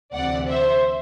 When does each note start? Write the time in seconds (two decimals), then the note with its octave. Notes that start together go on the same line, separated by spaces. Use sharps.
0.13 D2 C3 E3 D5 F#5
0.49 C5 E5